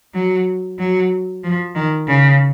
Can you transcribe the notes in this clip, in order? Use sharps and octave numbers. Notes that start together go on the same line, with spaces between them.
F#3
F#3
F3
D#3
C#3